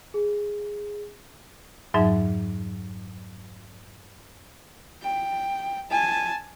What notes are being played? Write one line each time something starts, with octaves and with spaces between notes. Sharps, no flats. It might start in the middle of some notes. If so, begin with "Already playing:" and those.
G#4
F2 G#2 F#3 D#4 E5
G5
G#5 A5